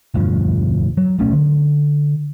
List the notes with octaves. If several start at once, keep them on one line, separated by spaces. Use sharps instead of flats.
E1 D2 G2 F3
F#3
D1 B1 A3 C#4
D3